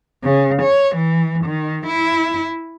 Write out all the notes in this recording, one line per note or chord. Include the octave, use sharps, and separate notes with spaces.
C#3
C#5
E3
D#3
E4